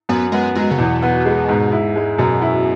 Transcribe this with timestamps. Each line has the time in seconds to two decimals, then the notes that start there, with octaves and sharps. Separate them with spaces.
0.09 F#2 B3
0.32 G#3 B3
0.55 F#3 G#3
0.71 C#3
0.78 E2 B2
1.02 B3
1.25 G#3
1.49 G#2
1.72 E4
1.96 G#3
2.18 F#2 B2
2.42 E4